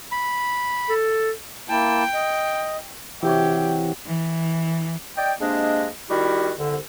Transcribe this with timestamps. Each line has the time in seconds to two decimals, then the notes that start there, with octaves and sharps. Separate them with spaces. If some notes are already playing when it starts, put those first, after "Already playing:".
0.12 B5
0.89 A4
1.69 A#3 E4 G5 A5
2.14 D#5
3.23 C3 E3 F#4 G4 C#5
4.07 E3
5.17 D5 D#5 G5
5.40 C3 G#3 A#3 D4 D#5
6.10 D#3 G3 E4 F#4 G4
6.59 C2 D3